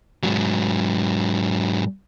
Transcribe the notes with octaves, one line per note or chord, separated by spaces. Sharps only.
G#2 F#3